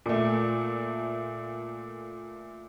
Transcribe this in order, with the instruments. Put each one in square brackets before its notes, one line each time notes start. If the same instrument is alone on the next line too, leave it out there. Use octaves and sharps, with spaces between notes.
[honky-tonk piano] A#2 A3